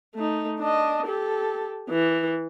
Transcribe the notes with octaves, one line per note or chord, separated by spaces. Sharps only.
A3 D#4
D4 D#5
G4 A4
E3